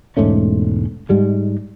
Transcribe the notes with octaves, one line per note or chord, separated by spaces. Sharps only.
E1 G#2 A3 C#4
G#2 G3 G#3